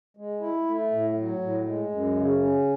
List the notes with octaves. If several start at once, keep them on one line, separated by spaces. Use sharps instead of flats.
G#3
E4
A3
A2
F#3
A2
G#3
F#2
C#3
C#4